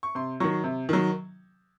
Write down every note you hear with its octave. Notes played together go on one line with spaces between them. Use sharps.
C#6
C3 C6
D#3 F#3 C#6
C3
D#3 F#3